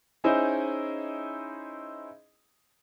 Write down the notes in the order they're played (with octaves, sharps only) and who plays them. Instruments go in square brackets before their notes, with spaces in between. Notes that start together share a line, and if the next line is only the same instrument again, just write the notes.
[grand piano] C#4 D#4 E4 G#4 C5 D#5